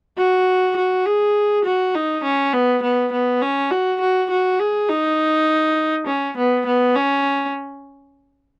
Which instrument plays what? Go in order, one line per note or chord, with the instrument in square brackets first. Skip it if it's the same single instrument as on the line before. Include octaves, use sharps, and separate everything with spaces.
[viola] F#4
F#4
G#4
F#4
D#4
C#4
B3
B3
B3
C#4
F#4
F#4
F#4
G#4
D#4
C#4
B3
B3
C#4